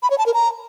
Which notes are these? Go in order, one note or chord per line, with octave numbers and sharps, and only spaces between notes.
B5
C#5
A5
A#4
A#5